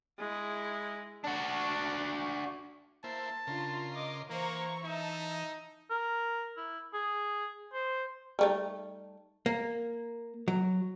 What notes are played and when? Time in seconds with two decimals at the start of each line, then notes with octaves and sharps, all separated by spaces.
0.19 G#3 E4
1.25 D4 F#4
3.04 A#3 E4 C5 A5
3.47 C#3 D4 F4 A#4 C6
3.92 D#5 D6
4.29 E3 A#3 C5 A#5 C#6
4.84 D#4 E5 A5
5.90 A#4
6.57 E4
6.94 G#4
7.74 C5
8.39 G3 A3 D#4
9.46 A#3
10.48 F#3